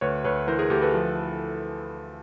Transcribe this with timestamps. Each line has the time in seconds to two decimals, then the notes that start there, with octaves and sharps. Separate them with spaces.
0.01 D2 B4 C#5
0.24 D2 B4 C#5
0.48 E3 A#4 C5
0.59 G#4 A#4
0.70 D2 G4 A4
0.82 A4 B4
0.94 F3